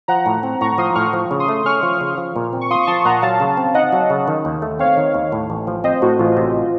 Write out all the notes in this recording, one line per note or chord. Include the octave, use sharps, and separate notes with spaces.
F3 F#5 A#5
A2
C4
A2 A#5 C#6
F3 C6 D#6
A2 C#6 F6
F3
C#3
C6 D#6
A3
C#4 C#6 F6
F3
C#3
F3
A#2
C4
C#6
F4 C6 D#6
C#6
F3 A5 C6
C6
A#2 F#5 A#5
F#3 F5 A5
C#3
C4
D#4 D#5 F#5
F#3
C#3
D#3
D#2
A3
C4 C#5 F5
D#3
D#2
A2
A1
F3
C4 C5 D#5
A2 F#4
A1 F4
C3